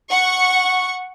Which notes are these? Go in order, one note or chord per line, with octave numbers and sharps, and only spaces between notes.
F#5 C#6